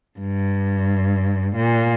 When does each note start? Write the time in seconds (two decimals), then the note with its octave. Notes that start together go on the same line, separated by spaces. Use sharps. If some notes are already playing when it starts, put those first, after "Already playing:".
0.20 G2
1.57 A#2